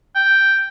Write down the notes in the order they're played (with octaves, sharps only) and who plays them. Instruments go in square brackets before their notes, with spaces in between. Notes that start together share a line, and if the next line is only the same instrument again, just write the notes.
[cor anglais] G5